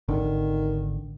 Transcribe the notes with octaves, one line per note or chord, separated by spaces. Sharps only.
G#1 D3 D#3